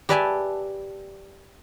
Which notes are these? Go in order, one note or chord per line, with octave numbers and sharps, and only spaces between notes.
G4 B4 D5 E5 G#5 A5